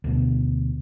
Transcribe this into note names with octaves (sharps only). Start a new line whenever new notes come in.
D2 B2